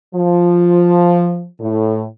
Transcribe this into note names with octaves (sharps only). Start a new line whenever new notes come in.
F3
A2